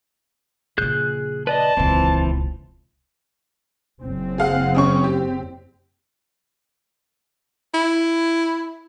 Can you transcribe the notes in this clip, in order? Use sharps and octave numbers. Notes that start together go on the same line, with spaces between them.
A#1 C#3 G#4 F#6 G6
B4 D5 D#5 A5
D#1 C#2 E3 C4
F#1 C4
G#4 F5 F#5
C#3 C#4 C#6
G4
E4